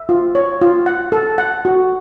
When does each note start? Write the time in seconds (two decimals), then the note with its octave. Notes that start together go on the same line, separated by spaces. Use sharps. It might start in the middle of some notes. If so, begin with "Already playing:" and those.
Already playing: E5
0.09 F4
0.35 C#5
0.61 F4
0.86 F#5
1.12 A4
1.38 F#5
1.65 F#4